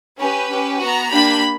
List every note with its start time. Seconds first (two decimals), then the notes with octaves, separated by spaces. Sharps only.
0.18 C#4 G4 B4
0.49 C#4 G4
0.79 B3 F#4 A#5
1.09 A#3 D4 G4 B5